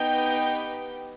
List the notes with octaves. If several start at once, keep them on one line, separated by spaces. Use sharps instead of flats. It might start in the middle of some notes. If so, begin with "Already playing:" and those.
Already playing: B3 D#4 G4 G5